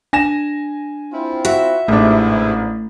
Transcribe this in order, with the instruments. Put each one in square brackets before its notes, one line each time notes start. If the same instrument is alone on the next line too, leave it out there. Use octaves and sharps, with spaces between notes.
[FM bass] D4 [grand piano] G#5 A#6 E7
[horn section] C4 E4 F4
[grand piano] F#4 [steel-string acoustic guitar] E5
[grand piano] A1 D4 [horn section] G#2 C3 E4 [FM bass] A3